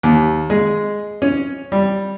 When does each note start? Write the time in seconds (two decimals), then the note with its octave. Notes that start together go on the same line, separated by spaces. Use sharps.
0.03 D#2
0.50 G#3
1.22 C#4
1.72 G3